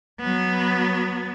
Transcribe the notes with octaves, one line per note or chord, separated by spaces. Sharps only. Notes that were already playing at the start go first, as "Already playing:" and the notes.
F#3 B3